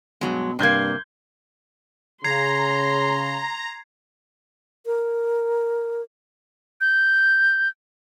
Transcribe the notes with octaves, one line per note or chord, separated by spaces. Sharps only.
G2 B2 F#3 G#3
G2 C3 A#3 C6 G6 G#6
C#3 A#5 C6 G#6 C7
A#4
G6